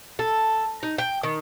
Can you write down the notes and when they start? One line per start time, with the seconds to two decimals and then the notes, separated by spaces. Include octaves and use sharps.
0.19 A4
0.83 D#4
0.98 G5
1.23 D#3